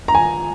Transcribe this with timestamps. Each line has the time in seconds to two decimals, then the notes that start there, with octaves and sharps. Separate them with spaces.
0.08 A#5
0.15 G#5